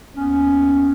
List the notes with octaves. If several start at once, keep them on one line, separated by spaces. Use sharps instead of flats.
D#2 B3 C#4